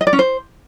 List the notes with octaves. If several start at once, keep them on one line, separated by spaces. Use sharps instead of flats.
D#5
D5
C#4
C5